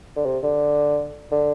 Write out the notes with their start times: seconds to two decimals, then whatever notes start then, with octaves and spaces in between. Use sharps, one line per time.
0.16 D3
0.26 C3
0.43 D3
1.31 D3